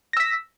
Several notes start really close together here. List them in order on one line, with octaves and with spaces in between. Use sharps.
A#6 E6 B6